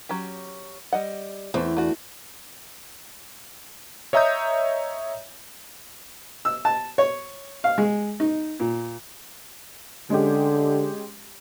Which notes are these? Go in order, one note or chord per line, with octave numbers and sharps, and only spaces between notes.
F#3 C#4 G4
G3 D#5 F#5
E2 A3 C4
A3 D4 F#4
C#5 D#5 E5 A#5 D#6 G6
E6
A5
C#5
F5
G#3
D#4
A#2
D3 G#3 C#4 G4